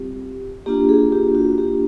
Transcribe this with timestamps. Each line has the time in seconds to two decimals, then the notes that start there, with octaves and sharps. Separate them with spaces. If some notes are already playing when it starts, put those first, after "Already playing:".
Already playing: G3 C4 F4 G4
0.66 A#3 D4 F4 G4
0.89 G#4
1.12 G4
1.35 F#4
1.58 G4